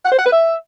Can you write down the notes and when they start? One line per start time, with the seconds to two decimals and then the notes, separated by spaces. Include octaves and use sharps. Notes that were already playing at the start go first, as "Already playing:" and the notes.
0.06 F#5
0.12 C5
0.19 F#5
0.26 B4
0.33 E5